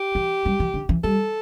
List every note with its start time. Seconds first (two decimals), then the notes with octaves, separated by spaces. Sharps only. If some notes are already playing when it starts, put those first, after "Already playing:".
Already playing: G4
0.15 E3
0.45 G3
0.60 E3
0.74 D3
0.89 E3
1.04 G3 A4